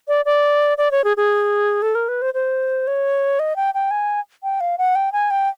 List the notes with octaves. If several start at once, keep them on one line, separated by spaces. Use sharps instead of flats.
D5
D5
D5
C#5
G#4
G#4
A4
A#4
B4
C5
C5
C#5
D#5
G5
G5
G#5
G5
F5
F#5
G5
G#5
G5